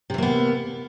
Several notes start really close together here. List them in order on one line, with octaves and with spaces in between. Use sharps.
C3 E3 A#3 B3